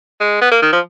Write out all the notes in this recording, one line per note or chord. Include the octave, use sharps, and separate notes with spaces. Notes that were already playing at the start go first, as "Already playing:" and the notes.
G#3
B3
A#3
D#3
F3